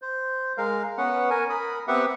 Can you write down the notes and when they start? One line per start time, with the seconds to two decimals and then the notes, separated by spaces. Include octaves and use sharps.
0.02 C5
0.58 G#3 A#4 F5
0.98 B3 C#4 B4 F#5
1.30 A#4 G#5
1.50 A#4 B5 D#6
1.88 B3 C4 G4 B4 E5 F#5